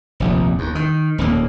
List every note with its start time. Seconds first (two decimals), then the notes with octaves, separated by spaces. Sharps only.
0.20 F1 A#1 D#2
0.59 D#2
0.75 D#3
1.18 D#1 D#2 A#3